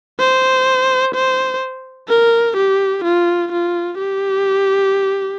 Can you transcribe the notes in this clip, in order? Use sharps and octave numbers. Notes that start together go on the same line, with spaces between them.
C5
C5
A#4
G4
F4
F4
G4